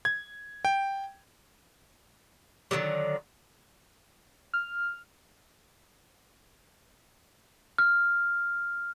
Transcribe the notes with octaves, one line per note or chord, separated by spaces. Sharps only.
G#6
G5
D3 D#3 F#3 G3
F6
F6